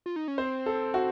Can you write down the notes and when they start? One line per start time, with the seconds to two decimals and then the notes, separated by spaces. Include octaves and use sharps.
0.06 F4
0.16 D#4
0.28 C#4
0.38 C4 C5
0.66 A4
0.94 F#4